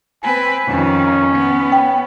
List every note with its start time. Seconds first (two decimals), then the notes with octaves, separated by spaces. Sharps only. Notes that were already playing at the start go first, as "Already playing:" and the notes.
0.23 C4 B4 G#5
0.67 F2 D#3 C#4
1.34 B3
1.72 G5